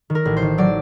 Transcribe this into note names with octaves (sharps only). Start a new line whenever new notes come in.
D#3
A#4
A1
C5
D#3
F#3 D5